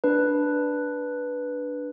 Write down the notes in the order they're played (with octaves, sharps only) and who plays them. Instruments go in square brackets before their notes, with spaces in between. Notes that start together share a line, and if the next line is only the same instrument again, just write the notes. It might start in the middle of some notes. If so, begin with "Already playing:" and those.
[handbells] D4 B4